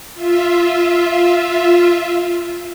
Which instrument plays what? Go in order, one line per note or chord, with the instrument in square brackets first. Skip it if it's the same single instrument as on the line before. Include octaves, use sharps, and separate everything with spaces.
[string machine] F4 E5